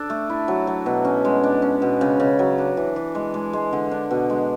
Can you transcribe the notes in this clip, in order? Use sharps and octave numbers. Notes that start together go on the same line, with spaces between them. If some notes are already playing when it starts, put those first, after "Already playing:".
Already playing: D4 A4
A3
E4
F#3
F#3
B2
C#4
G#3
D4
C#4
B2
C#3
C#3
F#3
D4
E3
E3
G#3
G#3
G#3
D3
D4
B2
G#3